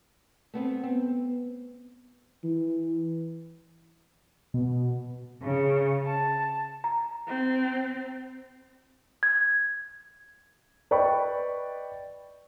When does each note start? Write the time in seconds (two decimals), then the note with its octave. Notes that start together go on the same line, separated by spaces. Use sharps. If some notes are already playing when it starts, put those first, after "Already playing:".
0.54 A3 B3 C4
0.84 B3 C4
2.44 E3
4.54 B2
5.42 C#3
6.06 A5
6.84 A#5
7.28 C4
9.23 G#6
10.91 B4 D5 D#5 G5 B5 C#6